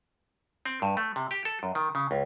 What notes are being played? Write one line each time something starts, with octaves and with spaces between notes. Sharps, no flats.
C4
G2
A3
C3
G4
A4
F#2
D#3
C#3
C#2